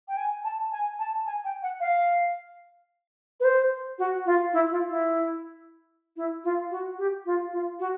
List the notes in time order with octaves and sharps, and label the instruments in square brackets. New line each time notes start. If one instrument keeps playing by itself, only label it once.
[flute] G5
G#5
A5
G#5
A5
G#5
G5
F#5
F5
B4
C5
F#4
F4
E4
F4
E4
E4
F4
F#4
G4
F4
F4
F#4